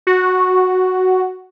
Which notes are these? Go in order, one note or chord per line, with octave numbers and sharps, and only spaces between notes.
F#4